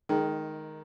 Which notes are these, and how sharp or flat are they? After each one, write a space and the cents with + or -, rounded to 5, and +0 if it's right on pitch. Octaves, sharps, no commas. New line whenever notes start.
D#3 +0 G#3 +25